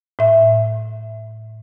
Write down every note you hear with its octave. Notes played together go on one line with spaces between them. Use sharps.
A2 E5